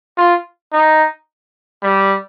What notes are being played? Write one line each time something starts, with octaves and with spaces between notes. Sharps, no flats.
F4
D#4
G3